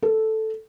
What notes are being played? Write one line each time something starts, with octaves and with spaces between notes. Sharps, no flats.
A4